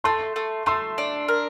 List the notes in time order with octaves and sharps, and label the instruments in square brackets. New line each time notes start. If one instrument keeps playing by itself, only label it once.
[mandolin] A3 [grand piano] A5 C6
[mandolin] A3
[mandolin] A3 [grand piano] C6 E6
[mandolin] D4
A#4